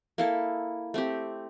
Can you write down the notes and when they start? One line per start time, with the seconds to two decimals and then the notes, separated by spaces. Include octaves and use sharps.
0.18 A#3 E4 A4
0.94 A3 C4 G4